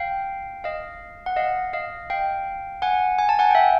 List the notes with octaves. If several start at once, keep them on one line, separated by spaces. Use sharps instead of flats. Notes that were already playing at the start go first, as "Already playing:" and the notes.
Already playing: F5 G5
D#5 F5
F#5
D#5 F5
D#5 F5
F5 G5
F#5 G#5
G#5
A5
F#5 G#5
G5
E5 F#5